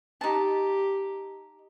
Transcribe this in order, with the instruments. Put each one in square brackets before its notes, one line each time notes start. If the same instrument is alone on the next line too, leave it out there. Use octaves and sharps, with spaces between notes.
[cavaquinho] D#4 A5 [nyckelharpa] G4